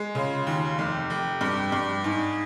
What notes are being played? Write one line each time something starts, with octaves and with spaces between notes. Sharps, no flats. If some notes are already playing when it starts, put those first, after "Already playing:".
Already playing: G#3
C#3 F4
D#2
F1 G4
F1
G2
G2
G#2 G#4